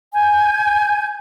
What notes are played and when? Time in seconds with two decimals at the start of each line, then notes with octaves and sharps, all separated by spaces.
0.15 G#5 G6